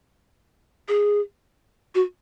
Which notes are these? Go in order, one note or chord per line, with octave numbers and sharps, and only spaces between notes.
G#4
F#4